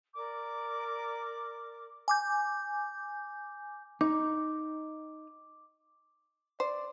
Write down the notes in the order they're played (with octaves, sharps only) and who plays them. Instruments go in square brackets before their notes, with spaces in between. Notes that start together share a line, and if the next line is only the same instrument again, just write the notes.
[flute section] A#4 D5 D6
[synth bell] G#5 D6 G6
[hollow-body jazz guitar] D#4 [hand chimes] D6
[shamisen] C5 [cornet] D5